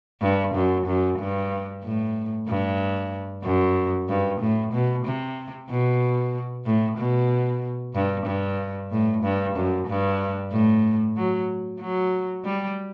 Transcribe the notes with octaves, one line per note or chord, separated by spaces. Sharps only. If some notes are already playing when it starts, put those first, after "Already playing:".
G2
F#2
F#2
G2
A2
G2
F#2
G2
A2
B2
C3
B2
A2
B2
G2
G2
A2
G2
F#2
G2
A2
F#3
F#3
G3